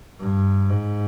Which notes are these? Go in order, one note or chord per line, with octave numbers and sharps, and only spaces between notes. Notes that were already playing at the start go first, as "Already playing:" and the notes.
G2
G#2